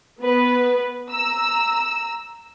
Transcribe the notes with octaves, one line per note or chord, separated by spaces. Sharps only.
B3 B4
A#5 E6